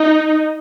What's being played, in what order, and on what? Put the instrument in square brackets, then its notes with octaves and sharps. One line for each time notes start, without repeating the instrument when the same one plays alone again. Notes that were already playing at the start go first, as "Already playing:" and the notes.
Already playing: [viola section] D#4